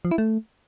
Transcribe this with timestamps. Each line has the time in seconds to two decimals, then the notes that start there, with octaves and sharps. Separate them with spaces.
0.05 F3
0.11 E4
0.18 A3